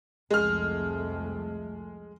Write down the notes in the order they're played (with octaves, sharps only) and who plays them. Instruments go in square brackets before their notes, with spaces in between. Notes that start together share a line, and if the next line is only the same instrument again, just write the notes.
[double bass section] C2 F2 A3 [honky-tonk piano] G#3 F6